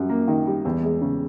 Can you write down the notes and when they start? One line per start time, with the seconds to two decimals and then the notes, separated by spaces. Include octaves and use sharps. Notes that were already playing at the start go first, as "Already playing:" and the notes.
Already playing: F#2 G3
0.09 A#3
0.28 D#3
0.47 G3
0.65 E2
0.83 G#3
1.01 C#3